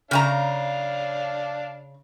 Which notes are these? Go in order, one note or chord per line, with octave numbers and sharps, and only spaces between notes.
C#3 D4 F5 G#5 A#5